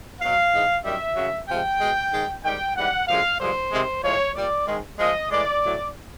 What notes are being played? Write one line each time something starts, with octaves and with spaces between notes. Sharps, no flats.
B2 F#3 F5
G#2 E3 G#3
F#2 D#3 G3 E5
F#2 C#3 F#3
C3 F3 G#3 G5
B2 G#3
G#2 D#3 G#3
G#2 D#3 G3 G5
G#2 E3 G3 F#5
F#2 D3 F3 G#3 F5
G2 D3 F3 G#3 C5
C3 D#3 G#3
A2 F3 G#3 C#5
A#2 G3 D5
G#2 D#3 G#3
A#2 F3 G#3 D#5
A2 E3 G#3 D5
A2 F#3